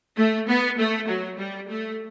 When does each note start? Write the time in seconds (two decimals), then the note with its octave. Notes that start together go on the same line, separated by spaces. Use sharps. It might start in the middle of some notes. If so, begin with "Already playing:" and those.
0.17 A3
0.48 B3
0.78 A3
1.08 F#3
1.38 G3
1.69 A3